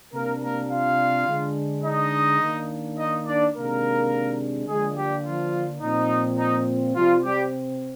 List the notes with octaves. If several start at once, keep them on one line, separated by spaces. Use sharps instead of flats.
C3 G3 A#3 D4 A#4
A#3 A#4
F4 F5
D3 G#3 D4
D#4 D#5
D#3 A#3 D4
D#4 D#5
D4 D5
C3 D#3 G#3 A#3 D4 A#4
D3 F3 G#3 A#3 D4 G#4
G3 G4
F3 F4
A#2 F3 C4 D#4
D#4
C3 F3 G3 C4 F4
G3 G4